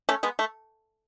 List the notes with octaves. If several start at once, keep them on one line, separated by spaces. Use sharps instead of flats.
A3 C#4
G#3 B3
A3